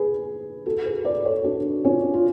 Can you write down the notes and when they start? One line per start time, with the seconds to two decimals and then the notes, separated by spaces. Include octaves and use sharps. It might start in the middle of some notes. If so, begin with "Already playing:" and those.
Already playing: G#4 B4
0.66 F#4 A4
0.85 G#4 B4
1.05 B4 D5
1.25 A4 C#5
1.44 D4 F#4
1.84 C#4 F4
2.14 F4